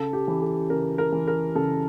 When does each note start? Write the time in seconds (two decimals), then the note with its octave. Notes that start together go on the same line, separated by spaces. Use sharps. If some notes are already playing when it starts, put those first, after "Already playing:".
Already playing: C#3 A4
0.13 G4
0.28 E3
0.42 A4
0.70 C#3 A#4
0.98 A#4
1.12 E3
1.28 A#4
1.55 C#3 A4